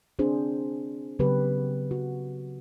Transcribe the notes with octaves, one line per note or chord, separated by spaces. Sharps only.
C4 D4 G#4 C5
C#3 F#3 B3 G4 B4
F#4